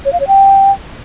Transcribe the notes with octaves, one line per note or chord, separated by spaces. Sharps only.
C#5
F5
C#5
G5